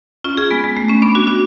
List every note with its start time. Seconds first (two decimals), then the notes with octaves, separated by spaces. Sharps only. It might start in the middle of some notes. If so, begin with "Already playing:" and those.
0.24 C#4 F4
0.37 F4 G#4
0.51 G#3 B3
0.64 G#3
0.77 A3
0.89 A3 C#4
1.02 B3 D4
1.15 D4 F#4
1.27 D4 F#4